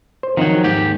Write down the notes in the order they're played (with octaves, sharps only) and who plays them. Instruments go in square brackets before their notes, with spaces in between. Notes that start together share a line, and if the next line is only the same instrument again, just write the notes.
[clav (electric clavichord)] C5
[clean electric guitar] D#3 F#3 [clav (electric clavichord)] F3 C4 D#4
[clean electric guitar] D#2 G#2 G4